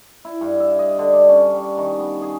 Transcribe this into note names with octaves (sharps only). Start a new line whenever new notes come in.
E4
G2
E5
D#5
D3
D5
C#4
G3
D#3
B3
G#4